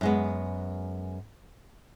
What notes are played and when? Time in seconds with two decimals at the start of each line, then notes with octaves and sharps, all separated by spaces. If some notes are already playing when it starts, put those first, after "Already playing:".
0.01 F#2 G#3 B3